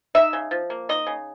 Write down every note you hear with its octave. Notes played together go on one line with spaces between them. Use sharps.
D#4 E5
C#3
F3
A#3
D#4 D#5
C#3